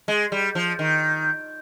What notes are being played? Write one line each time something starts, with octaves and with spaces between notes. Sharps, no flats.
G#3
G3
F3
D#3